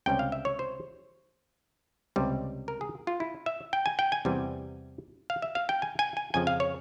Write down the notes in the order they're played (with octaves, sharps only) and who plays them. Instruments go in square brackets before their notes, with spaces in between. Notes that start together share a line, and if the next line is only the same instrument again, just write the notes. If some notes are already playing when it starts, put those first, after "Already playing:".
[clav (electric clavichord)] C#2 C3 G3 C#4 G5
F5
E5
C#5
C5
C#2 C3 G3
A#4
G#4
F4
E4
E5
G5
G#5
G5
G#5
E2 C3 E3 G3
F5
E5
F5
G5
G#5
G#5
G#5
F2 C#3 F3 G#5
F5
C#5